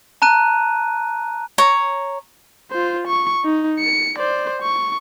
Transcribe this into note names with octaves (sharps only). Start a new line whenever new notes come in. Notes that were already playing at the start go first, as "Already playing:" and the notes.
A5 A#5 F#6 D#7
C#5 A#5
F4 C5
C#6
D#4
C#7
C5 D5
C#6